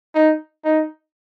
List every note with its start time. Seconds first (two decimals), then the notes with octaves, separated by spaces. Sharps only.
0.14 D#4
0.64 D#4